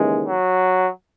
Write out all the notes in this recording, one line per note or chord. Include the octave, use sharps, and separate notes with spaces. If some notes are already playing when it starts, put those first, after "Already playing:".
Already playing: D#2 C#3 E3 G#3
F#3